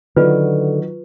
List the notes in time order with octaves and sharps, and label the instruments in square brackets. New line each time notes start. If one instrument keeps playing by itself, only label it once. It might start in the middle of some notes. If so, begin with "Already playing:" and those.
[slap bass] D3 [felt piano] D#3 F#3 [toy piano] F4 B4